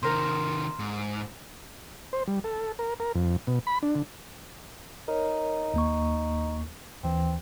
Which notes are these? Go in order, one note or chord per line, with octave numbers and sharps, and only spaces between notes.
C3 D#3 A#4 C5
G#2
C5
G3
A4
A#4
A#4
F2
B2
B5
D4
D3
D#4 A#4 C#5
D#2 A#3 C#6
D#2 E3 C4